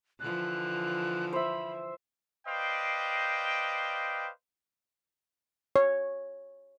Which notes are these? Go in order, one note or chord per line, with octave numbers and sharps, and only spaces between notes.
D3 E3 F3 F#6
C5 E5 B5
B4 C5 D5 D#5 F5 G5
C#5